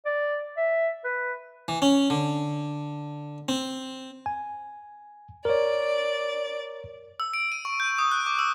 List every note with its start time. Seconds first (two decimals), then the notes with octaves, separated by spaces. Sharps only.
0.05 D5
0.57 E5
1.05 B4
1.68 E3
1.82 C#4
2.10 D3
3.48 C4
4.26 G#5
5.45 A#4 C#5 D5
7.20 E6
7.34 D7
7.52 D#7
7.65 C#6
7.80 G6
7.98 D#6
8.11 F#6
8.26 D6
8.39 E6